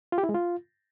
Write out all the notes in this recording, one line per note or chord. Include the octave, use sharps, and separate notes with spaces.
F4
G4
E4
G#3
F4